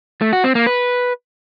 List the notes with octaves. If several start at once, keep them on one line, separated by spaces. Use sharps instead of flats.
A3
F#4
C4
A#3
B4